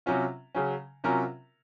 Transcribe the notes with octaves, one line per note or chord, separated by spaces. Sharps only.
C3 F#3 C#4 F4
C#3 F#3 C#4
C3 F#3 C#4 F4 A#4